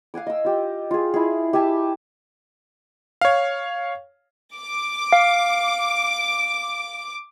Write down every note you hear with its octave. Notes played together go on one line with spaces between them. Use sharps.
F5 F#5 G#5 D6
D#5 E6
F4 G4
F4 G#4
E4 G#4
G4 E5 G#5 A5
C#5 F5
D6
F5